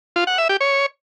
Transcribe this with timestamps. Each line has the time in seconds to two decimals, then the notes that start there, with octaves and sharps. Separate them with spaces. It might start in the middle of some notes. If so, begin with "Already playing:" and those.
0.16 F4
0.27 F#5
0.38 E5
0.49 G4
0.60 C#5